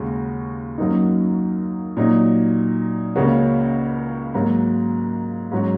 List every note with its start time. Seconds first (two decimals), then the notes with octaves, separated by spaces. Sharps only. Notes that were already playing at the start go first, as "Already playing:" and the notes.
Already playing: D#2 C#3 G#3 F#4
0.78 F#2 F#3 A#3 D#4
1.97 A#2 F#3 D#4
3.16 C#2 C#3 A#3 C#4 F#4
4.34 G#2 F#3 A#3
5.52 G#2 F#3 C#4 F#4